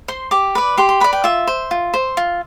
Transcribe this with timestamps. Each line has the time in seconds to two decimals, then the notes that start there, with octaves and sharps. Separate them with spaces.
0.08 C5 C6
0.31 G4 D6
0.55 B4 D5
0.77 G4 C6
0.89 C6
1.00 B4 D5 B5
1.13 G5
1.24 F4 E5
1.47 C5
1.71 F4
1.94 C5
2.17 F4